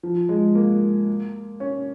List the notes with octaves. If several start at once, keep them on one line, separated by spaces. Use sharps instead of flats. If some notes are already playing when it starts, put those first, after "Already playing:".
F3
G#3
A#3
C#4